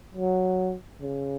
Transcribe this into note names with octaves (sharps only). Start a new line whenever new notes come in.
F#3
C#3